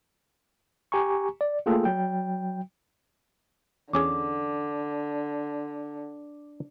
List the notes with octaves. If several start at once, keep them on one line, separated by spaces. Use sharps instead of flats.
G4 G#5 A#5 C#6
D5
A3 A#3 F4 G#4 A4 G5
F#3 G5
E2 D3 C#4 G#4 D6